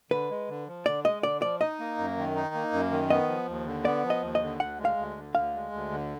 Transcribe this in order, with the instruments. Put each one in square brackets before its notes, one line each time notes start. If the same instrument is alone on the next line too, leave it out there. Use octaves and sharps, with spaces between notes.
[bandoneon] D3 [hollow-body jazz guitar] B4
[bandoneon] G#3
D3
F3
[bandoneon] D3 [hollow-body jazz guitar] D5
[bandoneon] G#3 [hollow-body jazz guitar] D#5
[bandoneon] D3 [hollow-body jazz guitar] D5
[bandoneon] F3 [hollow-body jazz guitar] D5
[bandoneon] D#4 [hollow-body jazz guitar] D#5
[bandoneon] A#3
F#2
D#3
D#4
A#3
F#2
D#3
[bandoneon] B3 [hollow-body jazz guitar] D#5
[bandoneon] F3
D#2
D3
[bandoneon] B3 [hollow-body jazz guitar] D5
[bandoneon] F3
[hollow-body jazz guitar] D#5
[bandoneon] D#2
[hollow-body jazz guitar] D#5
[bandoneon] D3
[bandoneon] D2 [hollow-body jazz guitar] F#5
[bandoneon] G#3
[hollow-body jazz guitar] F5
[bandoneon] D2
D3
[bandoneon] D2 [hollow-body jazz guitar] F5
[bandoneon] G#3
D2
D3